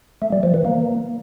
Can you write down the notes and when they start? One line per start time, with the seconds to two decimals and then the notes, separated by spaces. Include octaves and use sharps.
0.22 A3
0.32 G3
0.43 F3
0.54 E3
0.65 A#3